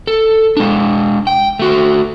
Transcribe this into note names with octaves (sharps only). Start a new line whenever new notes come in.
A4
G#3 D4
G5
A3 F#4